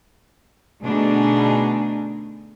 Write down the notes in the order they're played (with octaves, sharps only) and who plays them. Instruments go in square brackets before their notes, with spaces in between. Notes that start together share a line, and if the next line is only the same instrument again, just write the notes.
[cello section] B2 D3 A3 D4 D#4 G#4